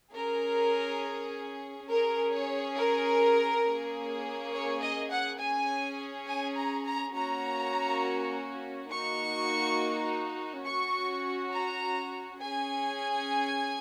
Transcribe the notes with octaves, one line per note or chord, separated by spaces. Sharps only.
C#4 G#4 A#4
C#4 G#4 A#4
C#5
A#4
A#3 C#4 G#4
C#5
D#5
F#5
C#4 G#4 G#5
G#5
A#5
A#5
A#3 C#4 F#4 A#5
A#3 D#4 F#4 C#6
C#4 F#4 C#6
A#5
C#4 G#4 G#5